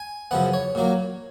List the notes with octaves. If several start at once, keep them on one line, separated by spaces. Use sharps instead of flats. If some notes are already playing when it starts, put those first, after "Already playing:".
Already playing: G#5
F#2 C#3 F3 B3 F#5
C#5
A#2 F#3 A#3